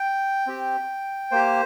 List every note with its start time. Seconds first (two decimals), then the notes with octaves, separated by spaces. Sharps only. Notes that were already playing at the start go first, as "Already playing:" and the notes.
Already playing: G5
0.47 C4 G4
1.31 A#3 G4 C5